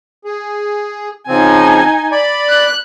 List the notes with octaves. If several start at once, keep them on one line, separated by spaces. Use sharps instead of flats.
G#4
C#3 F3 C4 D#4 G#5
D5 B5
F#6